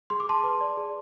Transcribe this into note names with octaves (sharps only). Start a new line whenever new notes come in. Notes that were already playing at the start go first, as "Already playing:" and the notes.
G#4 C6
D6
G#4 A5 C6
B4
D5
G#4